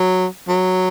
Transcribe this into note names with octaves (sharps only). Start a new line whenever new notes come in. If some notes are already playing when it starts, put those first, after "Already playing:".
Already playing: F#3
F#3